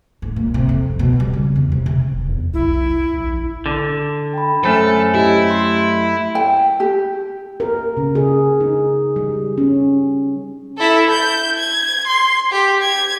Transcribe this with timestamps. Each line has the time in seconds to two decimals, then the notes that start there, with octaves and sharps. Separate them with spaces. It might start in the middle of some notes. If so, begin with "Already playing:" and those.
0.22 G#2
0.36 A#2
0.54 C3
0.69 F2
0.99 B2
1.20 G3
1.34 C#3
1.56 E2
1.72 C3
1.86 C3
2.14 D#1
2.29 E2
2.54 B1 E4
3.14 A#1
3.66 D3
4.33 G5 B5
4.64 F#2 A3 A4 C5 G#5 F6
5.14 E4 G4 D#5
5.50 C6 B6 C7
6.35 G5
6.80 G4
7.60 A#4
7.97 C#3
8.15 G#4
8.60 D#4
9.16 G3
9.58 C#4
10.78 E4 A4
11.10 G6
11.58 G#6
12.07 C6
12.52 G4
12.82 G#6